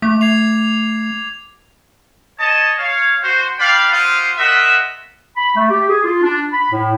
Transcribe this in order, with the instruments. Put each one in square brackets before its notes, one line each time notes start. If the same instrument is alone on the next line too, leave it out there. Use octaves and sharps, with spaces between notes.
[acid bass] A3 [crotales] D6
[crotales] G#6 C7 F7
[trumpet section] C#5 D#5 A5
C#5 F5
F#4 C5
D4 B4 D5 F5 G5 B5
F4 G4 C5 F5 F#5 D#6
F4 F#4 A#4 D#5 E5 F#5
[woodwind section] B5
A3
G4
G#4
F4
D4
B5
A2